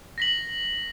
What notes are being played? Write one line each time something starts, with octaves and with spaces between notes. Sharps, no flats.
A#6 B6 F#7